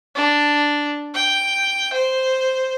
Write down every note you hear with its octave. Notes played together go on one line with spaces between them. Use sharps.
D4
G5
C5